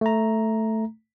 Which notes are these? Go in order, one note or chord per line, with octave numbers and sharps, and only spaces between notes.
A3 A#5